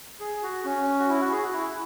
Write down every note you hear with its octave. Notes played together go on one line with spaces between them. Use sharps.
G#4
F#4
C#4
F#4
E4
F#4
G#4
F#4
E4